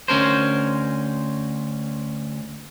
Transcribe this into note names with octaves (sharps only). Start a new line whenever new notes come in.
D2 C#4 A#4 C5